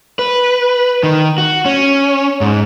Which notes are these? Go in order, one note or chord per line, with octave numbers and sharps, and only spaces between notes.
B4
D#3
F#4
C#4
G#2